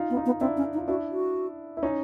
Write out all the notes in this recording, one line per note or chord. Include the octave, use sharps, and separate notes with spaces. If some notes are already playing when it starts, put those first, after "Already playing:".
Already playing: D#4 F4
B3
D#4 F4
B3
C4 D4 E4
C#4
D#4
F4
D4 E4 F#4
F#4
E4
C#4 D#4